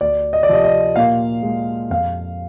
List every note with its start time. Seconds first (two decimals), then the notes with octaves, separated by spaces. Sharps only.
0.01 D2 D5
0.33 D#5
0.43 D5
0.49 C3 F3 D#5
0.64 D#5
0.96 A#2 F5
1.43 G#3
1.90 F2 F5